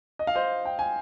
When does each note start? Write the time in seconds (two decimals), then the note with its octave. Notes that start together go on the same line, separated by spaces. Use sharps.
0.19 D#5
0.27 F5
0.35 C5 D#5
0.65 G5
0.79 G#5